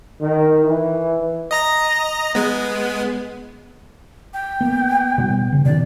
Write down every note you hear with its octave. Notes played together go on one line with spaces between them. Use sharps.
D#3
E3
D#5 A#5 A#6
G#3 B3
G5
A#3 B3
B2 G3 B3
C#3
B2 D#3 D5